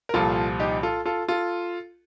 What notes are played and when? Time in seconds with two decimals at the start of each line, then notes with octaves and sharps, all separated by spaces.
0.09 A#4
0.14 C2 A#2 F3 F4 A4
0.60 D#4 G4
0.83 F4 A4
1.06 F4 A4
1.29 F4 A4